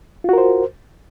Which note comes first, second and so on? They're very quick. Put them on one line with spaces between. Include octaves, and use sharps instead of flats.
F4 F#4 A#4 C5